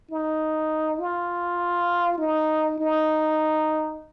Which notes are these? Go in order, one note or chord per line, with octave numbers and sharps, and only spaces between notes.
D#4
F4
D#4
D#4